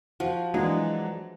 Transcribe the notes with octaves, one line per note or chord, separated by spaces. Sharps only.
F3 F#4
E3 F#3 G#3 D4